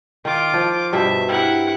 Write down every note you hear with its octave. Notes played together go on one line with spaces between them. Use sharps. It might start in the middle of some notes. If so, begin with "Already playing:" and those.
D#3 F4 D6
F3
G2 B2 C5 E5
E4 G4 A#4 F#5